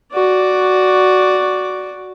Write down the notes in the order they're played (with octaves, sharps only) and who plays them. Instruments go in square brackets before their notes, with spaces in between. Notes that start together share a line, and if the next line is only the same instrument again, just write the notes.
[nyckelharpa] F#4 D5